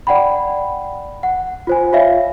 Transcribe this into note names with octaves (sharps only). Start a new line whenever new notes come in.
D5 F#5 G5 B5
F#5
F4 C5 G#5
F4 C#5 E5 F5